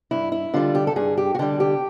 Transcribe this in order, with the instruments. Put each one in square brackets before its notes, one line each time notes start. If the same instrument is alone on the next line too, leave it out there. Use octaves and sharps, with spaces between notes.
[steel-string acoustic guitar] G2 E4
E4
D3 G3 F4
G4
A4
G2 G#4
G4
F#4
D3 G3 G4
G4